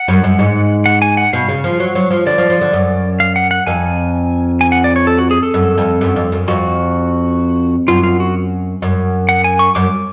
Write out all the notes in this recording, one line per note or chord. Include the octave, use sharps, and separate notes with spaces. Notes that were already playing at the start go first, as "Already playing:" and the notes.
Already playing: F#5
F#2
F#2
G#2
F#5
G#5
F#5
B2 F5
C#3
F3
F#3
F#3
F3
D3 D5
F3
F3
D3
F#2
F5
F#5
F#5
F2 G#5
G#5
F#5
D5
C#5
A4
F#4
G#4
A4
F#2
F2
F#2
F2
F#2
F2 F#4
F#2 F4
F4
F#4
F#2
F#5
G#5
C#6
F#2 D6